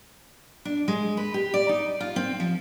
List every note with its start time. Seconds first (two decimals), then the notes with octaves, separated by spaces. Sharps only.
0.65 D4
0.88 G#3
1.17 B4
1.34 G4
1.54 D5
1.69 D#4
2.00 F4
2.16 C4
2.40 F3